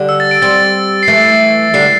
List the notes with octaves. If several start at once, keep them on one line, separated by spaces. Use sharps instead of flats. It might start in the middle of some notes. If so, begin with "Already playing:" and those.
Already playing: D3 G3
E6
A6
D7
G3 C4 A6
C7
E3 A3 A6
D3 G3 C7